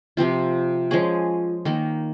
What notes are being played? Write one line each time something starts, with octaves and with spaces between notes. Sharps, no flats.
C3 F3 C4 F4
F3 G#3 C#4 G#4
D#3 A#3 D#4